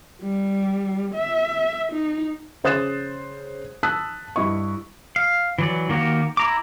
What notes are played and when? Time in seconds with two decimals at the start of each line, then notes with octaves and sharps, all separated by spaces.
0.22 G3
1.14 E5
1.93 D#4
2.64 C#3 C5 D#6 F#6 A6 E7
3.83 A5 D#6 E6 F#6 B6
4.36 G2 E4 D#5 C#6
5.16 F5
5.59 E3 F#3 D5
5.89 D#3 A#3 F#4 G4
6.37 E4 A#5 D6